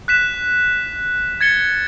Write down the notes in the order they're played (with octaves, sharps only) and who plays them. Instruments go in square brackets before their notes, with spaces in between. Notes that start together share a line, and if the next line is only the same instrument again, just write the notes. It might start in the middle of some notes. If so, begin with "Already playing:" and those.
[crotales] F#6 B6 E7
G#6 A6 C#7 G7